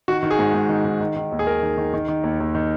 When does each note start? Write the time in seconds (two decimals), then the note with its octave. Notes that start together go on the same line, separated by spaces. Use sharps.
0.08 D#3 F#4
0.23 D#3
0.31 G#4
0.39 G#2
0.54 G#2
0.69 D#3
0.85 D#3
1.00 D#3
1.16 D#3
1.32 D#2
1.39 G#4
1.46 D#2 A#4
1.62 D#3
1.78 D#3
1.94 D#3
2.08 D#3
2.23 D#2
2.40 D#2
2.55 D#3